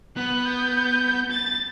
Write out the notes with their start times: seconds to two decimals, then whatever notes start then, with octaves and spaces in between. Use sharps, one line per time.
0.17 B3 F#6
0.45 G6
1.30 A6